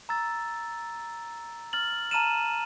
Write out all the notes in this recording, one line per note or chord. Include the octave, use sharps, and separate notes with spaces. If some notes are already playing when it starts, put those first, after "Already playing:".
A#5 E6 A6
F6 A6 F#7
A5 A#5 F6 D#7 E7